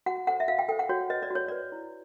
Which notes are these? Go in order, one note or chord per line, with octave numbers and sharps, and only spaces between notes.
F#4 F#5
A4 C5 F#5
E5
F#4 F5
G5
A4 C5 G5
F#5
F#4 C#5
B4 D#5
D5
F#4 C#5
B4 D5
E4